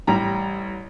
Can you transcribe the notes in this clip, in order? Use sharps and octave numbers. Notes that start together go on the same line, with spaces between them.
A1 G3 A#5